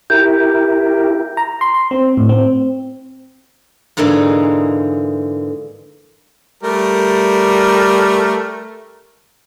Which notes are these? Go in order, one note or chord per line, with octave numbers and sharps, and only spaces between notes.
E4 G4 A#4 G6
A#5
C6
C6
C4
A2
C4
G#2 D3 E3 A#3 D#4 G#4
G3 A3 A#4